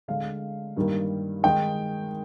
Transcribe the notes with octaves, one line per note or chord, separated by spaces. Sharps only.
D3 G#3 D4 F5
G2 D#3 G3 A#3
D#3 G#3 D#4 G5